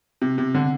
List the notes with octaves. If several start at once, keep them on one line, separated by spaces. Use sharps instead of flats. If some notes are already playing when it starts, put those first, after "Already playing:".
C3
C3
D3